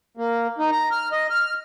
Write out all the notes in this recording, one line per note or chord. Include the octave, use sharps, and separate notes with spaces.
A#3
D#4
A#5
F6
D#5
F6